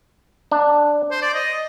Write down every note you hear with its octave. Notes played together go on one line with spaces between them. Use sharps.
D4
C5
D5
D#5